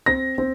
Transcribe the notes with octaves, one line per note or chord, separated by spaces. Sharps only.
C4 A#6
C4